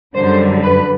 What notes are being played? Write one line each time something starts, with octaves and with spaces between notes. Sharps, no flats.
F#2 D3 G3 C5
B4